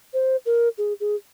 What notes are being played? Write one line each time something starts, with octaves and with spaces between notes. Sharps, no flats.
C5
A#4
G#4
G#4